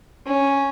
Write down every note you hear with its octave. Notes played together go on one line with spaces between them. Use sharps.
C#4